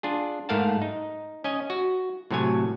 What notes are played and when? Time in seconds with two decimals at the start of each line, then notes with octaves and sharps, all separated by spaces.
0.03 D4 F4 G#4
0.49 G#2 A3 A#4 F5 F#5 A5
0.82 D#4
1.44 C#4 D#5 G#5
1.70 F#4
2.31 A2 C3 F#3 C#5 G#5